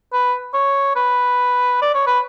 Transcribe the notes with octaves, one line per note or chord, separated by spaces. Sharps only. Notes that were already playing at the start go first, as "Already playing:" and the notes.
B4
C#5
B4
D5
C#5
B4